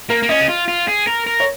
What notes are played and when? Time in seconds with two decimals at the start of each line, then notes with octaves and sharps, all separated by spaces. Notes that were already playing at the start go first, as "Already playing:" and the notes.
0.10 A#3 A#4
0.23 A#3
0.29 C#4 D#5
0.41 G#4
0.49 F4
0.68 F4
0.88 G#4
1.07 A#4
1.27 A#4
1.40 C#5